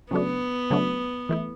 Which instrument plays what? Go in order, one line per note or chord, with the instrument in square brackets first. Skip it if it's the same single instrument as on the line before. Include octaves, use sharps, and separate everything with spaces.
[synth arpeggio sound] C#3 F#3 A3 D4 [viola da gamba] B3
[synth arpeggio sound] C#3 F#3 A3 D4
E3 A3 E4